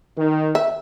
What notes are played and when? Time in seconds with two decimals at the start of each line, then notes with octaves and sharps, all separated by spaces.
0.17 D#3
0.55 E5